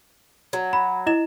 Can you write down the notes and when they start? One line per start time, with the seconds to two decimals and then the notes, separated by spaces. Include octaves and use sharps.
0.53 F#3
0.73 B5
1.06 E4 D#5 E7